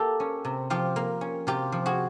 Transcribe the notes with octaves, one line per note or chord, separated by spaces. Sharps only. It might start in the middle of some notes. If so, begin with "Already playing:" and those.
Already playing: A#3 G4 A4
C#4
C3
F3 F4 G4
A#3
C#4
C3 F4 G4
F3
F#4 G#4